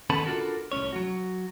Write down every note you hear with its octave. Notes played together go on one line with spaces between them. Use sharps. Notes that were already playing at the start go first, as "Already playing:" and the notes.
D#3 B3 C#4 A4 A5 B5
D4 F4 F#4 A4 A#4
C2 A2 C#4 C#5
F#3 F#4